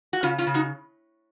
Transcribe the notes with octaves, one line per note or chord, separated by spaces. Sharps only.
F#4
C#3 C#4 F4
C#4 F4
C#3
D#4 F#4